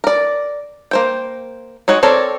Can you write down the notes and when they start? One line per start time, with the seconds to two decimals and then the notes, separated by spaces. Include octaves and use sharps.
0.04 A#4 D5
0.91 A#3 C5 G5
1.88 G#3 D#4 F#4 C#5 D#5
2.03 C4 A4 A#4 C#5 D5